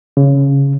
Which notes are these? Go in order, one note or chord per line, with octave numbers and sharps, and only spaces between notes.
C#3